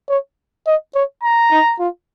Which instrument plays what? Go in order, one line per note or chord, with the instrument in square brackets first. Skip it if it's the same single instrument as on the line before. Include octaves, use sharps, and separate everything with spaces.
[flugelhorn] C#5
D#5
C#5
[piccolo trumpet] A#5
[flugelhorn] D#4
F4